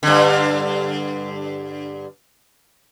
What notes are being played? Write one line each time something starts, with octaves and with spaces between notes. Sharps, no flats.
G2 D3